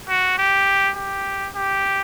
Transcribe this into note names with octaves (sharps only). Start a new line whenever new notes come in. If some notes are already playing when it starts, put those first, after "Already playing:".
F#4
G4
G4
G4